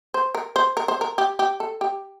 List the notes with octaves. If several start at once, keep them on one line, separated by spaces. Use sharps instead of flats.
C5
A#4
C5
A#4
C5
A#4
G4
G4
A4
G4